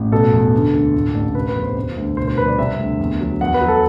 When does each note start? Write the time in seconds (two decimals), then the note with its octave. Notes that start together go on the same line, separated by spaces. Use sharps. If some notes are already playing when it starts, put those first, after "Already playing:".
Already playing: A1
0.12 B2 A4
0.33 E2
0.53 D3
0.74 D2
0.94 A2
1.15 A1
1.35 C3 B4
1.49 B4
1.56 E2
1.63 C5
1.77 C3
1.97 D2
2.17 B2 C5
2.28 C5
2.38 C2 B4
2.48 D5
2.59 C3 E5
2.79 D2
2.99 E2
3.21 F#3
3.41 E2 F#5
3.54 B4
3.61 F#3
3.68 A4